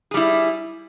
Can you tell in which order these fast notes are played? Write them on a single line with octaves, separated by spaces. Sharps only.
G#4 G3 E4